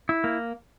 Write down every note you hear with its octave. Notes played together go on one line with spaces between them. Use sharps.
E4
A#3